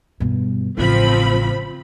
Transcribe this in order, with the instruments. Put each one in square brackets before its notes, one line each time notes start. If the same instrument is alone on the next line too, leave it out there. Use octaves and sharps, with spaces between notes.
[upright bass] G2 B2
[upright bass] A1 C#3 [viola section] F3 C4 B5